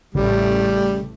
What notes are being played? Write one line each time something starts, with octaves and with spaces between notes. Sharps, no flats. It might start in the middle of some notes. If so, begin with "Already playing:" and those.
A1 C#3 G3 A3